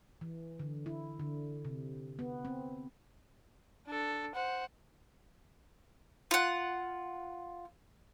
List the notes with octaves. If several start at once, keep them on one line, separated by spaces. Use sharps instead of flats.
E3
D3
E4
D3
C3
B3
C4
D4 A4
C5 F#5
F4 F#5